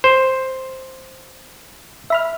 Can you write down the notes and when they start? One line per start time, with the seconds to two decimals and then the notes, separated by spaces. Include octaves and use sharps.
0.04 C5
2.10 E5 B5 F6